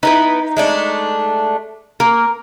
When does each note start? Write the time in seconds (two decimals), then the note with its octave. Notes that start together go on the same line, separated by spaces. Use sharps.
0.03 B3 D#4 E4 B4
0.57 G#3 A3 D4
2.00 A#3 A#4